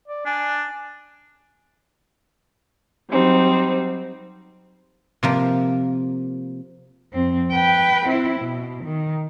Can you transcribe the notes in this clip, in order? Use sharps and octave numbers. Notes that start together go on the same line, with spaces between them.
D5
D4 G#5
F#3 G3 C4 D#4
C3 F3 A#3
F2 C4
B4 G5
C4 E4
B2
D#3